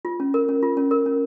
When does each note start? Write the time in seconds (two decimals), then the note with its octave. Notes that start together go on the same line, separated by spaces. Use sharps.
0.05 F4
0.20 C#4
0.34 A#4
0.49 C#4
0.62 F4
0.77 C#4
0.91 A#4
1.06 C#4